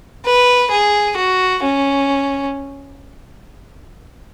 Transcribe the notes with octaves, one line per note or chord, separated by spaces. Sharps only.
B4
G#4
F#4
C#4